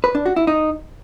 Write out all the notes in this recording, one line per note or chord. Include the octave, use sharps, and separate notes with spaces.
B4
D4
F#4
E4
D#4